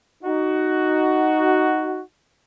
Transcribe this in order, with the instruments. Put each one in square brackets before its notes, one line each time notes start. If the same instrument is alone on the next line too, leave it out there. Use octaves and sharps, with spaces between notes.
[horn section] D#4 F#4